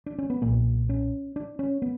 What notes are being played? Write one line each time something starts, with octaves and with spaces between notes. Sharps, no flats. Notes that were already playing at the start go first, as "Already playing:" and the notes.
D4
C#4
B3
B1 A#2 A#3
C#4
D4
C#4
B3